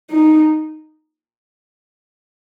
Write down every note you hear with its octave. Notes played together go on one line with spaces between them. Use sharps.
D#4